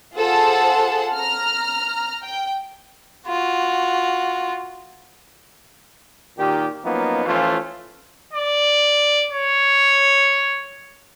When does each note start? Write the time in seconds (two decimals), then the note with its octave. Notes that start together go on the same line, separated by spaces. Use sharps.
0.16 F4 G#4 A4 C5 F#5 A5
1.16 A#5 F6
2.22 G5
3.27 F4 F#4
6.38 A#2 D#3 G4
6.85 F3 F#3 A#3 B3 C#4 D#4
7.25 A1 E3 F3 A3 C#4 F4
8.33 D5
9.32 C#5